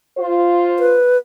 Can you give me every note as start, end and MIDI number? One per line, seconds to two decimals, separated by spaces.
0.18 0.97 65
0.18 0.97 72
0.79 1.17 71